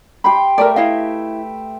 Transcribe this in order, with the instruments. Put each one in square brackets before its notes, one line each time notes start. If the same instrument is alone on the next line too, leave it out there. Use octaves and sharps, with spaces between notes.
[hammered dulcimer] G4 G5 C6 [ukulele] B5
[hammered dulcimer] A3 B4 E5 [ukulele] A#4 D5
[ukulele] E4 D#5 F5